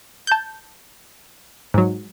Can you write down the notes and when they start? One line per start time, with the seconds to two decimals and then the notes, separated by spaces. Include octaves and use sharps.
0.27 A5 G6
1.74 G#2 F#3